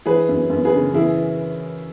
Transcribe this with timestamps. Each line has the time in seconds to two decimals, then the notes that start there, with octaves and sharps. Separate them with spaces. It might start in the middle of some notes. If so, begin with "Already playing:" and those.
0.06 E3 G#4 B4
0.29 F#2
0.49 F#2
0.65 G#4 B4
0.72 C#3
0.93 E3 E4 G#4